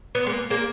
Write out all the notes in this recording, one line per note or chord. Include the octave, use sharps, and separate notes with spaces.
B3
G#3 A#3
G#3 A#3